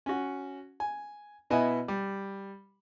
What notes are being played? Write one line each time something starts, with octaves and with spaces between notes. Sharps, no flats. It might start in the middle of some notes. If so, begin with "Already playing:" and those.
C#4 F#4
G#5
B2 B3 E4 D#5 E5 G#5
G3